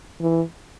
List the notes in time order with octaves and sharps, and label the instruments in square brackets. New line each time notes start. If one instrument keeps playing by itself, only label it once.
[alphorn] E3